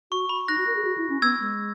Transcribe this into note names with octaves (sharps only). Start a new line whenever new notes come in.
F#4 C#6
B5
D#4 F#6 A#6
F#4
A#4
G#4
F#4
E4
C#4
B3 E6 G#6
G#3